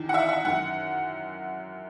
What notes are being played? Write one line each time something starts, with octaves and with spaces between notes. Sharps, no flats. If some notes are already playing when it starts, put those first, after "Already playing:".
Already playing: E2 D#3
F#5
E5
E5
F#2 D#3 F#5